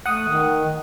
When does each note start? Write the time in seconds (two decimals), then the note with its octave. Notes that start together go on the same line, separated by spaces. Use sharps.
0.06 A3 F#5 D#6
0.28 D#3